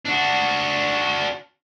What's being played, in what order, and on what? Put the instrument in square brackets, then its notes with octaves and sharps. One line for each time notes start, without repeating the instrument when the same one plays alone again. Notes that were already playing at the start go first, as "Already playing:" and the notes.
[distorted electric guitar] D4 F#4